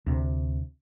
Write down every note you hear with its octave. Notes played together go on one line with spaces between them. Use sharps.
D2 C3